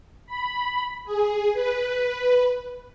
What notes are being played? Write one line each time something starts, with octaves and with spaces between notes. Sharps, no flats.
B5
G#4
B4